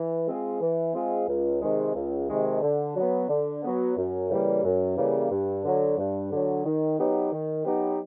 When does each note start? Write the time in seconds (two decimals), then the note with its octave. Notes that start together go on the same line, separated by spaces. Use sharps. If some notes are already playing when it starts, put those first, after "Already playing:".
Already playing: E3
0.27 G#3 C4 F4 G#4
0.61 E3
0.94 G#3 C4 F4 G#4
1.28 C#2
1.61 C3 D#3 G#3
1.95 C#2
2.29 C3 D#3 G#3
2.61 D3
2.96 F#3 B3
3.29 D3
3.63 F#3 B3
3.97 F#2
4.29 C#3 E3 G3 A#3
4.63 F#2
4.97 C#3 E3 G3 A#3
5.31 G2
5.64 D3 F#3
5.98 G2
6.32 D3 F#3
6.65 D#3
6.98 F#3 B3 D#4 G4
7.32 D#3
7.65 F#3 B3 D#4 G4